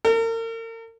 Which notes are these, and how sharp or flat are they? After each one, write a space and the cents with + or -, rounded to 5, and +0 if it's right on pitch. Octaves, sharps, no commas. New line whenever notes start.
A#4 -40